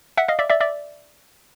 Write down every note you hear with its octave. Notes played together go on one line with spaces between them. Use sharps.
E5 F#5
D#5 F5
D5 E5
D5 E5
D5 E5